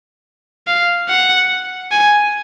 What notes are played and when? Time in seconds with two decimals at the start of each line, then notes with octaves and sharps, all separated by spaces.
0.67 F5
1.09 F#5
1.91 G#5